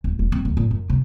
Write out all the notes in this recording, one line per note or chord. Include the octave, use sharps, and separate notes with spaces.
D1
E1
C4
D2
A#2
F#2
C3